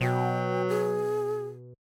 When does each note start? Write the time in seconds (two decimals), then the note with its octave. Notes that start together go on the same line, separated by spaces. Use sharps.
0.01 B2 F#3 G5
0.69 G#4